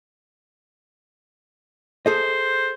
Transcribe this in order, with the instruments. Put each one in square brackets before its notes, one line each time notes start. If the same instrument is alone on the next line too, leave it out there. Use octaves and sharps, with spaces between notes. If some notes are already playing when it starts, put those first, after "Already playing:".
[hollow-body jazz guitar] G#4 A4 D#5 [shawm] C5